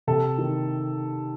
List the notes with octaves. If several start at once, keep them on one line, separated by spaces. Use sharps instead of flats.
C3 A4
D#3